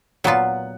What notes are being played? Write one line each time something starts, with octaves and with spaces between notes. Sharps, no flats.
A#2 F#3 B3 F4 F#5